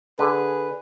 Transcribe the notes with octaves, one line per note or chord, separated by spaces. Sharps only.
D3 G#4 B4